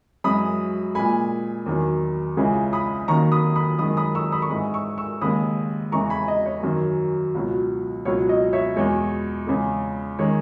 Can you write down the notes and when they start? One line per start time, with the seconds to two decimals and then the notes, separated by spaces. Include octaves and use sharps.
0.24 F#2 E3 G#3 B5 D#6
0.95 A#2 G#3 G#5 B5
1.66 E2 D#3 F#3
2.37 C#2 C#3 E3 G#3
2.73 B5 D#6
3.08 D#2 D#3 F#3 A#5 C#6
3.32 B5 D#6
3.56 B5 D#6
3.79 F#2 D#3 G#3 B5 D#6
3.97 B5 D#6
4.15 C#6 E6
4.32 B5 D#6
4.42 C#6
4.50 G#2 E3 G#3 B5 D#6
4.74 C#6 E6
4.98 C#6 E6
5.21 D#2 C#3 G#3 B5 D#6
5.92 E2 C#3 E3 G#3 A#5 C#6
6.10 G#5 B5
6.28 D#5
6.46 C#5
6.63 F#2 D#3 F#3
7.35 C#2 B2 F#3
8.05 C#2 B2 F#3 C#5
8.29 D#5
8.53 C#5 E5
8.76 E2 B2 G#3 C#5
9.47 E2 C#3 G#3
10.19 D#3 G#3 C#5